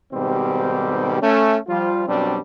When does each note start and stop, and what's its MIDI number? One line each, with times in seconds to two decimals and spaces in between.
0.13 1.16 44
0.13 1.16 47
0.13 1.16 51
0.13 1.16 55
0.13 1.16 60
0.13 1.16 67
1.21 1.59 57
1.21 1.59 61
1.68 2.03 53
1.68 2.03 55
1.68 2.03 65
2.06 2.38 42
2.06 2.38 47
2.06 2.38 54
2.06 2.38 55
2.06 2.38 60
2.06 2.38 62